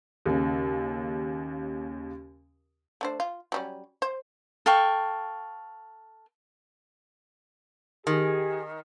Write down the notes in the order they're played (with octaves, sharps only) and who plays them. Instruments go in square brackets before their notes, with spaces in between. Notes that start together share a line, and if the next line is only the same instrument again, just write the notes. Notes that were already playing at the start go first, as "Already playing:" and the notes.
[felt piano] D#2 C#3
[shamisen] A3 D4 C5
F4
F#3 G3 C#4
C5
[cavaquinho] A4 F5 G5 C#6
[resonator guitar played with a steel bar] D#3 [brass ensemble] G4 G#4